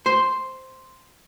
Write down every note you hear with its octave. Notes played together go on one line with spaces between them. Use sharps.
C5 C6